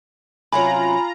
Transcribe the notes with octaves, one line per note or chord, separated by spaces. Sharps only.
C3 F#3 C#4 F4 G#5 A#5 B5